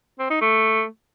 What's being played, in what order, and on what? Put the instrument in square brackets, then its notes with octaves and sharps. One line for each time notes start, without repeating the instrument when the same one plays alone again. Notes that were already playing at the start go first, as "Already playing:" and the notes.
[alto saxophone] C4
D#4
A3